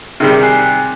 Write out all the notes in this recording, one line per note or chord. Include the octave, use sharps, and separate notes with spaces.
C3 D#3 G3 G#4
G#5 F#6 C7